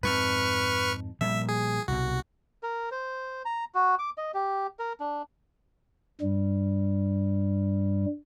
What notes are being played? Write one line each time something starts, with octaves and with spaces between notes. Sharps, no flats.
F2 G#2 B4 C#6 F6
A#2 F3 G3 E5
G#4
C2 B2 F#4
A#4
C5
A#5
F#4
D6
D#5
G4
A#4
D4
G2 G3